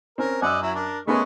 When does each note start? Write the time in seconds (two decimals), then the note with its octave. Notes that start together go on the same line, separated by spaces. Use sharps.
0.18 C4 C#4 A#4
0.42 F#2 D5 D#5 F#5 E6
0.62 F#3 E4
0.74 D4 A#4
1.07 G#3 A3 B3 C#4 A#4 C#6